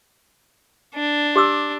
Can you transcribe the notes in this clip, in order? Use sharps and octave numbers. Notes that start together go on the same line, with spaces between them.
D4
G4 D6 E6